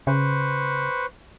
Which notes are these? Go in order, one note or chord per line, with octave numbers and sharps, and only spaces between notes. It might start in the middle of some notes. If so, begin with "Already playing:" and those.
C#3 B4 C5 C#6